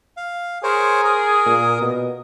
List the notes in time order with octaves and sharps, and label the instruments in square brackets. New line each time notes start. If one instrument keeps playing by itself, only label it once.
[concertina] F5
[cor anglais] G#4 [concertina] A#4 C5 C#5
[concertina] A#4 [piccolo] D#6
[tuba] A#2
B2